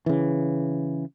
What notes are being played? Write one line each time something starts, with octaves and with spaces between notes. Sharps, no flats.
C#3 E3